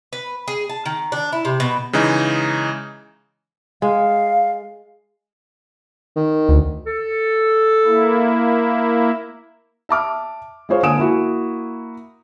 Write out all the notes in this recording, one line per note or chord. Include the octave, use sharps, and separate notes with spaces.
B4
G#4
A5
D#3
D4
E4
C3
B2
C#3 E3 G#3 D#4
G#3 F5
D#3
D2
A4
A#3 E4
E5 A5 D6 F6
G#3 F4 G#4 C5 C#5 F5
D3 A#3 G#5 D#6 D7 E7
A#3 E4 F#4